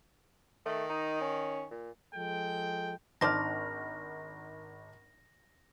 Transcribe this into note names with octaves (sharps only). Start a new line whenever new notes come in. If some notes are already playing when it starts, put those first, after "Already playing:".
D#3 A3
D#4
C#4
A#2
F3 G#3 A4 G5
G#1 D4 D#4 C5 A5 F6 A#6